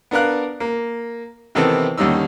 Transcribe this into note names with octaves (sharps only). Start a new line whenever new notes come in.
B3 D4 A#4 F5 F#6
A#3
C3 D#3 E3 B3 C4 A4
D#2 D3 G3 C#4 D#4 E6